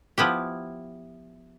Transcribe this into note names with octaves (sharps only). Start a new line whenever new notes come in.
F3 B3 E4 G4